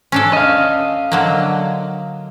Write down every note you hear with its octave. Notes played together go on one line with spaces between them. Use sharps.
C#4 D4 A4
D#5 F5
D3 F#3 A#3